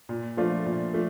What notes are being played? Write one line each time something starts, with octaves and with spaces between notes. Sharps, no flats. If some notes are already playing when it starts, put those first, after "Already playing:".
A#2
F3 A3 D4 F4
A#2
F3 A3